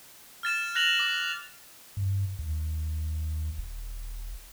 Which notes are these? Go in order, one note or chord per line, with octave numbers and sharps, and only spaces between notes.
F6 A6 E7
F#6 A6 A#6 F7 F#7
D6
G2
D#2
D#1